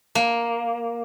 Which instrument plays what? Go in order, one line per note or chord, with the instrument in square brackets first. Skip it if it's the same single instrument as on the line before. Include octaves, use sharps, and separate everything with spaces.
[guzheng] A#3